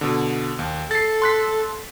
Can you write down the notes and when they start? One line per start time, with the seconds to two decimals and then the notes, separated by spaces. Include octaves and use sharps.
0.01 B2 D3
0.59 D#2
0.91 A4 A6 C7
1.22 C6 F#6 B6